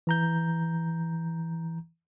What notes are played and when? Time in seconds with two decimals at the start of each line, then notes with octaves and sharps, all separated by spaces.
0.07 E3 A#5 G6